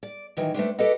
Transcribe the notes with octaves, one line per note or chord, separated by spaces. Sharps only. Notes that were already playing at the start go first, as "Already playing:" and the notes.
D5
A#2 D#3 E3 F#3
A3 B3 C4 D4
G4 A4 B4 D5 D#5 F#5